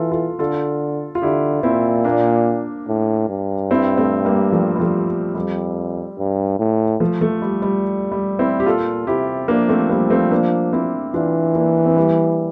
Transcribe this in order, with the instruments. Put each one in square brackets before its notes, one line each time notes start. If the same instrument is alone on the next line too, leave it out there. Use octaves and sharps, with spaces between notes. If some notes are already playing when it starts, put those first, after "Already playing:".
Already playing: [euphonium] E3 [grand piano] F4 A4
[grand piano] F4 A4
[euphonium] D3 [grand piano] F4 A4
[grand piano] F4
[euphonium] D3 [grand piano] E4 G4
[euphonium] A#2 [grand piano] C4 E4
[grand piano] A#3 D4
[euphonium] A2
G2
[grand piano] C4 E4
A3 C4
G3 A#3
F3 A3
G3
F3 A3
G3
[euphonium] F2 [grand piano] G3
[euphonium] G2
A2
[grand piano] F3 A3
F3 A3
G3
G3
G3
C4 E4
G4
[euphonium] A#2 [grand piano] F4 A4
[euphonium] C3 [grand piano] E4 G4
[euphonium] F3 [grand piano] A#3 D4
[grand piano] A3 C4
G3 A#3
A3 C4
A#3 D4
C4 E4
[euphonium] E3 [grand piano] D4 F4
[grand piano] A#3 D4
C4
G3 A#3